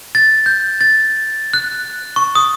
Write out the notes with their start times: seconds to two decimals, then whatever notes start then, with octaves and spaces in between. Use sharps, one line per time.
0.15 A6
0.46 G6
0.81 A6
1.53 F#6
2.16 C#6
2.35 D#6